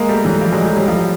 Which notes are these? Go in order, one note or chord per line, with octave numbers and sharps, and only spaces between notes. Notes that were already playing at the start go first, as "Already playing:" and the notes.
Already playing: G#3 A#3
G3 A3
E3 F#3
F3 G3
F#3 G#3
G3 A3
F#3 G#3
F3 G3